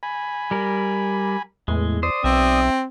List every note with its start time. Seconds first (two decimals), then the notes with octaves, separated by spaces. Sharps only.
0.03 G#5 B5
0.51 G3 A#4
1.68 E2 A2 G#3
2.03 C5 D5 D#6
2.24 B1 C4 E5